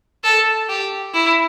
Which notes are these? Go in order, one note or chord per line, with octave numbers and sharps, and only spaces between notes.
A4
G4
E4